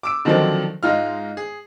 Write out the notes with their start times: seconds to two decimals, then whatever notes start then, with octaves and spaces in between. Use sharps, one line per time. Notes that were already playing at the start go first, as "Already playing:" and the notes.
0.03 D6 E6 D7
0.25 D3 D#3 F3 F#3 C4 D4
0.83 G#2 G#3 D#4 F4 F6
1.37 G#4